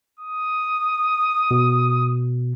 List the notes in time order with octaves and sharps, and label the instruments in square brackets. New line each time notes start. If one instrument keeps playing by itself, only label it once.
[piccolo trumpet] D#6
[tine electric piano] B2